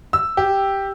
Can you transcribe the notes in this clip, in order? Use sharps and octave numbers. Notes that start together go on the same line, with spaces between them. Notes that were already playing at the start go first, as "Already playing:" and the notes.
E6
G4